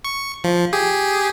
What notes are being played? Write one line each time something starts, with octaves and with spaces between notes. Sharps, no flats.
C#6
F3
G4 G#4